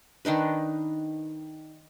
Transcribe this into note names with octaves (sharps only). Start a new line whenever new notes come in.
D#3 D4 D#4 B4